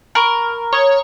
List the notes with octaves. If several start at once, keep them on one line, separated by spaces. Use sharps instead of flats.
A#4 B5 C#6 D7
C#5 A#5 D#6 G7